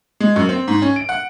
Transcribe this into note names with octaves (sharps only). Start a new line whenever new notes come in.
G#3
F#2
C4
G#2
C#4
D7
F#5